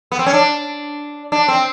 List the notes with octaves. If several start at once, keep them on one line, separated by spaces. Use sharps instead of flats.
B3
C4
C#4
D4
D4
C4